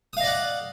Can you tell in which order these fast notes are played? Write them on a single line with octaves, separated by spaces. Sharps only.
D#6 F5 D#5 D5 F#5